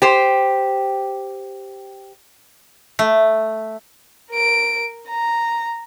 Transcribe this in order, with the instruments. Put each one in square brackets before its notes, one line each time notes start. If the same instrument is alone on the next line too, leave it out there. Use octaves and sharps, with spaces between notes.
[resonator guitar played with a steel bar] G4 C5
[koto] A3
[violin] A#4 D7
A#5